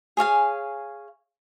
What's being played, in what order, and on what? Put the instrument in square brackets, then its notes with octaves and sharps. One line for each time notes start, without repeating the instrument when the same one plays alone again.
[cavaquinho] G#4 C#5 F5 G#5